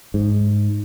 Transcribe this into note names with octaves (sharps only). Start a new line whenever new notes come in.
G#2